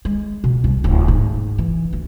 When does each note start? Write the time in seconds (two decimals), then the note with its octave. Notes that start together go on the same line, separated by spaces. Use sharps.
0.05 G#3
0.44 B2
0.64 C2
0.84 D1
1.08 G#2
1.58 E3
1.93 D2